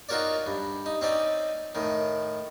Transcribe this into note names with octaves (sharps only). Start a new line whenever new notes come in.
D#4 F4 F#4 A#4 C#5 D5
G2
D#4
C4 C#4 D#4 D5
A2 D#3